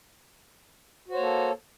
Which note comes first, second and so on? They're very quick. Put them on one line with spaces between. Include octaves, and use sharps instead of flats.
F#4 C5 C#5 A#3 A4